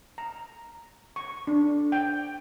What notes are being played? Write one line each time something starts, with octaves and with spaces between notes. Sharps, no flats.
A#5
C#6
D4
G5